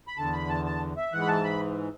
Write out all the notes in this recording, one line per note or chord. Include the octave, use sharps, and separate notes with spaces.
B5
E2 D3 A5
B5
A5
A5
E5
G#2 E3 F#5
B5
A5
B5